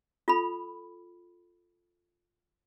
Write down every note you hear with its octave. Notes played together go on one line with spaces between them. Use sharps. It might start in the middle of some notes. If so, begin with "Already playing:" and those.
F4 A4 B5